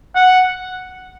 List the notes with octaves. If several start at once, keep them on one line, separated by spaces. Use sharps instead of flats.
F#5